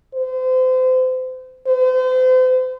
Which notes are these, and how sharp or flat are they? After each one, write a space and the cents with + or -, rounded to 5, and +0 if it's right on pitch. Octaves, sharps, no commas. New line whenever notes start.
C5 -35
C5 -40